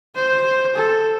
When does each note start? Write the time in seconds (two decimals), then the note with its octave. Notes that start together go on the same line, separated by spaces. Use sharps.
0.16 C5
0.76 A4